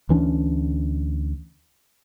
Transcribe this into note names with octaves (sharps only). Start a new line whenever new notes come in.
D2 E3 C#4 D4